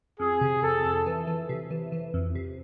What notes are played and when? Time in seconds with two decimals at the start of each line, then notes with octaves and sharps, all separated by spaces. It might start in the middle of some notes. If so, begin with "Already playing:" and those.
0.20 F2 G#4
0.41 C3
0.63 F2 A4
0.85 F2
1.06 E3
1.27 E3
1.49 C3
1.71 E3
1.92 E3
2.14 F2
2.35 C3